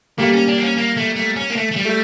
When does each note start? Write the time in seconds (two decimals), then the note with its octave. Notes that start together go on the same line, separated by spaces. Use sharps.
0.18 G3 A3 A#3
0.33 C#4
0.48 D4
0.58 A#3
0.63 C#4
0.78 A#3
0.97 A3
1.16 A3
1.36 C#4
1.50 A#3
1.56 A3
1.71 A3
1.76 G3
1.85 A3